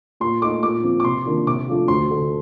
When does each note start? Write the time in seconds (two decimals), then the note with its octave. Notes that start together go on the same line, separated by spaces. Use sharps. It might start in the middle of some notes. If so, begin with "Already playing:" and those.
0.20 A#2 C6
0.41 A3 D#4 D6
0.63 A#2 D6
0.84 F3 C4
1.00 D6
1.04 C3 C6
1.25 D#3 A#3 D4 F4
1.47 C3 D6
1.68 F3 A3 D4 F4
1.88 D2 C6
2.10 D3 A3